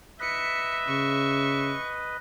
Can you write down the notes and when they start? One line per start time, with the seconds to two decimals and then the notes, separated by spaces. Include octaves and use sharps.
0.20 B4 D#5 E5 B6 C#7
0.88 C#3 C#6